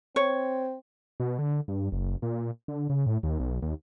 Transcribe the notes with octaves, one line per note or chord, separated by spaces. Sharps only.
C4 C#5
B2
D3
G2
F#1
A#2
D3
C#3
A2
D#2
B1
D#2